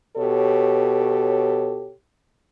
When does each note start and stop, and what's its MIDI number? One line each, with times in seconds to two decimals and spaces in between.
0.17 1.91 47
0.17 1.91 67
0.17 1.91 69
0.17 1.91 73